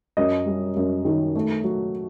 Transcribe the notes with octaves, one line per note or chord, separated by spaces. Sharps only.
F#2 D#5
G3
F#2
D#3
A3
F#3